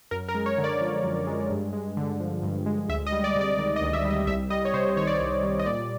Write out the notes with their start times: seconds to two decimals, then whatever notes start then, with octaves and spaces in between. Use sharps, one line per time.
0.11 F#2 A#4
0.28 A#4
0.35 G#3
0.46 C#5
0.58 D3
0.64 D5
0.81 F3
1.04 F#2
1.27 G#3
1.50 G2
1.73 G#3
1.97 D3
2.20 F3
2.43 G2
2.66 G#3
2.89 D2 E5
3.07 D#5
3.12 G3
3.24 D5
3.36 C3
3.41 D5
3.58 D#3 D5
3.76 D#5
3.81 D2
3.93 E5
4.05 G3
4.10 D#5
4.27 C2 E5
4.50 G3 D#5
4.65 C#5
4.74 C3 C5
4.97 D#3 C#5
5.07 D5
5.17 C2 C#5
5.43 G3
5.59 D#5
5.66 A#2 D5